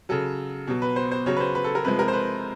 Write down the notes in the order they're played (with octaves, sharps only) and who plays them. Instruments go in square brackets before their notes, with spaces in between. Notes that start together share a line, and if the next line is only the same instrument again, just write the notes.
[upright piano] C#3 F#3 A4
B2 F#3
B4
C5
C5
C#3 F#3 C#5
B4
C5
B4
A4
A#4
C3 F3 G#3 B4
A#4
C5
B4